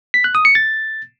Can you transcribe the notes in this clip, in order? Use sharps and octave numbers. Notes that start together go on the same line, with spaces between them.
B6
F#6
D#6
C#7
A6